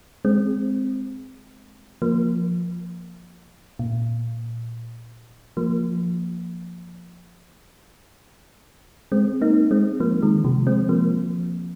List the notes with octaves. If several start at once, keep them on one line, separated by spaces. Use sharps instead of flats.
G#3 C4
F3 A#3
A#2
F3 A#3
G#3 C4
A#3 D#4
G#3 C4
F3 A#3
D#3 G#3
C3 F3
G#3 C4
F3 A#3